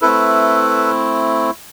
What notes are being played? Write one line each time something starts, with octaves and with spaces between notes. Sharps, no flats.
A3 C4 E4 A4 B4